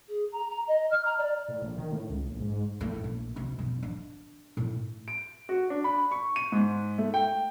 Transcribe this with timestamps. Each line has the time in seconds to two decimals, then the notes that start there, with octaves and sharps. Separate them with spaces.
0.08 G#4
0.32 A#5
0.49 A#5
0.67 D#5
0.90 F6
1.05 A#5
1.18 D5
1.48 A2
1.62 A#1
1.78 D#3
1.92 A2
2.09 C#2
2.25 A#1
2.40 G#2
2.81 A2
3.04 A#1
3.36 D2 C3
3.58 G2 B2
3.83 D4
4.57 A2
5.08 D7
5.49 F#4
5.70 D4
5.84 B5
6.11 C#6
6.36 D#7
6.52 G#2
6.98 A3
7.14 G5